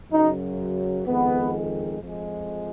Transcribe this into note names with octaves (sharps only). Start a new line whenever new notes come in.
F#2 C#3 F#3 D#4
F2 D#3 G#3 B3
F2 F3 G#3